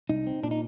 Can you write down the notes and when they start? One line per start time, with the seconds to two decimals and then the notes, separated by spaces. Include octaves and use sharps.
0.09 C2 D#4
0.27 C4
0.43 A#2 D4
0.51 D#4